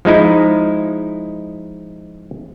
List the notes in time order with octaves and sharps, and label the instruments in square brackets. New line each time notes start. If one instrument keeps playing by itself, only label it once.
[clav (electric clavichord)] F3 G#3 D#4 E4